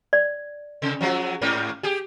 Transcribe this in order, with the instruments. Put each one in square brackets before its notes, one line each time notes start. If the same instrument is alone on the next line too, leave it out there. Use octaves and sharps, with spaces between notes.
[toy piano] D5
[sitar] C3
F3 F#3 G#3
G#2 A#3 C#4
G4 G#4